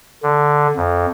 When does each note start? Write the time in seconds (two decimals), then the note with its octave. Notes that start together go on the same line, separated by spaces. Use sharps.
0.23 D3
0.76 F2